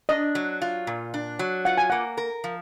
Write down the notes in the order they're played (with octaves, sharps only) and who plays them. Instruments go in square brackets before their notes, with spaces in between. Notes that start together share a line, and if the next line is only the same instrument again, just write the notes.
[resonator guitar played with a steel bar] D4 [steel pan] D#5
[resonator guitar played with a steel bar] F#3
F4
A#2
D4
F#3
[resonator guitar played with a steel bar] F4 [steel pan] F#5
[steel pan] G#5
[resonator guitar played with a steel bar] A#3 [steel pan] F#5
[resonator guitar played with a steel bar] A#4
F3